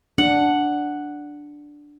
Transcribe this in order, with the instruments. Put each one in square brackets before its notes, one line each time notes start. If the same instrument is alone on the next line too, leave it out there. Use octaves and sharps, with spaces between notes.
[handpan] D4 [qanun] F#5